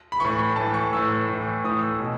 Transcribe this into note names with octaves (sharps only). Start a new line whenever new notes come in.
B5
A2 E3 C#6
B5
A2 E3 A5
C#6
A2 E3 E6
A2 E3
A2 E3 D#6
E6
B2